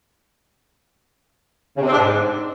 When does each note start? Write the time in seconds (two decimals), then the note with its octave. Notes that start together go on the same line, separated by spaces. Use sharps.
1.77 C#3
1.82 C3
1.87 C4
1.92 D4
1.97 G#2